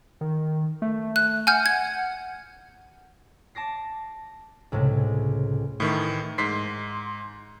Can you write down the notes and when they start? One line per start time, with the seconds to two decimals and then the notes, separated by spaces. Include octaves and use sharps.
0.21 D#3
0.82 A3
1.16 F#6
1.47 F#5 G#5 F6 G6
1.66 G#6
3.55 A5 D6 A#6 C7
4.72 C#2 A2 C3 G#3
5.80 A2 D#3 E3
6.38 G#2 C6 B6 C7